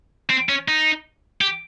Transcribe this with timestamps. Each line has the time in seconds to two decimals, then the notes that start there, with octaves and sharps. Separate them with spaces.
0.30 C4
0.49 C#4
0.68 D#4
1.41 G4